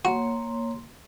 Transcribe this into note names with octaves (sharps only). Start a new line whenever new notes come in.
A#3 F#4 C#5 C6